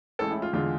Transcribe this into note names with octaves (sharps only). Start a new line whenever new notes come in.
A1 A2 G#3 A4
E4
F4
E2 D3 G#3 F4